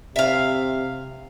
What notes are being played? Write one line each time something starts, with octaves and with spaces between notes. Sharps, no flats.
C3 E5 F5